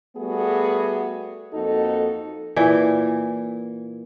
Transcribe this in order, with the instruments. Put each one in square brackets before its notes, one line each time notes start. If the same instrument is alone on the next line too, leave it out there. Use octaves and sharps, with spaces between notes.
[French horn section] G3 A3 B3 F#4 G#4
F2 A#3 D#4 F#4 A4
[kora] A#2 E3